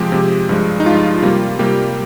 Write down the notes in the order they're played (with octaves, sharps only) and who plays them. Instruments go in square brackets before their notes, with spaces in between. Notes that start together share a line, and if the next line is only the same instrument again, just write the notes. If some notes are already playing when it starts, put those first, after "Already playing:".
Already playing: [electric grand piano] C3 F3 G#3 G4
C3 F3 G#3
G2 F3 G#3
D#4
G2 F3 G#3 F4
C3 G3 A#3
C3 G3 A#3 G4